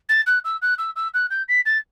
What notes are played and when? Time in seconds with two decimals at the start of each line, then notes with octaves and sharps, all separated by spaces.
0.09 A6
0.27 F#6
0.45 E6
0.62 F#6
0.78 E6
0.96 E6
1.14 F#6
1.30 G6
1.49 B6
1.66 A6